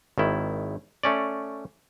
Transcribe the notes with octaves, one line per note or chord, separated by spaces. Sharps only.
G#1 D#3 E4
A3 C#4 D5